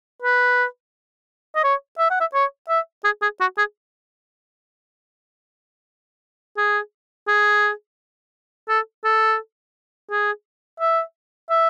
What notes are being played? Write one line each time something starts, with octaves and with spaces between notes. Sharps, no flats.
B4
D#5
C#5
E5
F#5
E5
C#5
E5
G#4
G#4
F#4
G#4
G#4
G#4
A4
A4
G#4
E5
E5